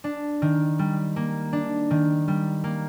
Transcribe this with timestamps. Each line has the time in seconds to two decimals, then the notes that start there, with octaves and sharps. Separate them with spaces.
0.04 D4
0.42 D#3
0.79 G3
1.16 A#3
1.53 D4
1.91 D#3
2.28 G3
2.64 A#3